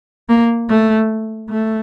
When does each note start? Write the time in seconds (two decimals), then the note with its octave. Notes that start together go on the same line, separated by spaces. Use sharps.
0.29 A#3
0.69 A3
1.50 A3